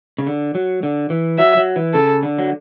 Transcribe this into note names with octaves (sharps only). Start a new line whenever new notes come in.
C#3
D3
F#3
D3
E3
F#3 E5
F#3
E3
C#3 A4
D3
F#3